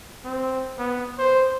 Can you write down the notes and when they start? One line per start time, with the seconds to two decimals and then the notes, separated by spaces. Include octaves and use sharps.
0.25 C4
0.78 B3
1.19 C5